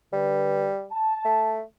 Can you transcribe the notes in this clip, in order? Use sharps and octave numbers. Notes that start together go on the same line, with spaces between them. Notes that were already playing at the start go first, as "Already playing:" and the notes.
D3 G3 B4
A5
A3